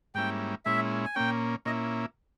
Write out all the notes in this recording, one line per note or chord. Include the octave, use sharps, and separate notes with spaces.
G#2 G3 A#3 C#4 E4 G5
A#2 G#3 C#4 E4 E5
G#5
A#2 A#3 C#4 G5
A#2 A#3 C#4 E4 D#5